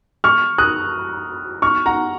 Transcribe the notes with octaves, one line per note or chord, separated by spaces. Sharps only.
C#6 F6
D#6 F#6
C#6 F6
F#5 A#5